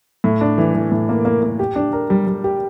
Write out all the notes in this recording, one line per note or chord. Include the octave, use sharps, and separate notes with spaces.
A2
D4
E3
E3
A2
A#3
A#3
A#3
G4
D4
A#4
G3
G3
G4